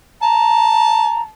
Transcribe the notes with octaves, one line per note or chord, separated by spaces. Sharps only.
A5 A#5